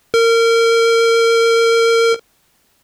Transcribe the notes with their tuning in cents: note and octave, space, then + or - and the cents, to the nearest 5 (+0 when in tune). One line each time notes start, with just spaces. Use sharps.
A#4 -25